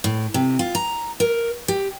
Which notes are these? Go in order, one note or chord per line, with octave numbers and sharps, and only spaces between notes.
A2
C3
F4
A#5
A#4
G4